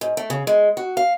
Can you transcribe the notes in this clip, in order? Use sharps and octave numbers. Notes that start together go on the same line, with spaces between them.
G#2
A3
C#3
G#3
F#4
F5